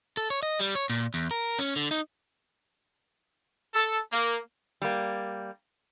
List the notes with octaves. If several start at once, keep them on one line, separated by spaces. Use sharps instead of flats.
A4
C#5
D#5
G3
C#5
A#2
E2
A#4
C#4
D3
D#4
A4
A#3
G3 A#3